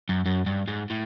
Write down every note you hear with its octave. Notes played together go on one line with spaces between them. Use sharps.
F#2
F#2
G2
G#2
A2